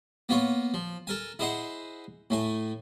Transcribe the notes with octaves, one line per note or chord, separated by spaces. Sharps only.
A#3 B3 F4 C#5
F3
A4 A#4 G#5
E4 G#4 C5 D#5 F#5
A2 A3 G#5